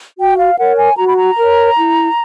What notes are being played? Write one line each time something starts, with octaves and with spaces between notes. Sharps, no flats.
F#4 G5
F5
A#4 C#5 F#5
G#5
F#4 A#5
B5
A#5
A#4 C#5
E4